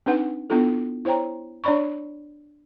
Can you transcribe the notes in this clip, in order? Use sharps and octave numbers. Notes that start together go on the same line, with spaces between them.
C4 D4 D#4 B4 F#5
B3 D4 E4 F4 A4
E4 C5 C#5 G5 A#5
D4 C#5 D5 B5 C#6